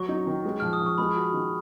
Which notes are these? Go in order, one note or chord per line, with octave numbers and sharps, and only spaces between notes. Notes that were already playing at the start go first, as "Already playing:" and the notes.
Already playing: F#3 C#6
D#4
D#3
G#3
F3 F6
D#6
F3
C#6
G#3 B5
F#4
D#3